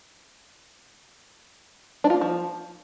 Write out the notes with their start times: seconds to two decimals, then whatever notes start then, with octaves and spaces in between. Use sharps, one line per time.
2.04 D4
2.10 F4
2.16 A#3
2.21 F3